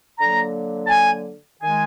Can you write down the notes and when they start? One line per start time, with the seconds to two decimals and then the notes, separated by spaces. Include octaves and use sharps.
0.19 D3 F#3 A#3 A#5
0.85 A5
0.90 G#5
1.61 D#3 G#3 G#5